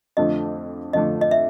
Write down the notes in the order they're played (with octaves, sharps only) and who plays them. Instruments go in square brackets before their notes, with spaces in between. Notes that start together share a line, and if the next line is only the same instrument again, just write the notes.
[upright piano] F2 D3 F3 A3 D4 [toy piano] D#5
[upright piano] F2 D3 F3 A3 D4 [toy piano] D#5
[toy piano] D#5
E5